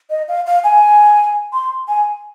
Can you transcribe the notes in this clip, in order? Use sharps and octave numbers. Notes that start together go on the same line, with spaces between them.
D#5
F5
F5
G#5
C6
G#5